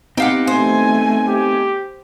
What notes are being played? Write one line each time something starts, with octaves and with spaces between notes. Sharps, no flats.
B3 C4 D#4 G4 F5 F#5
A3 C5 G#5
G4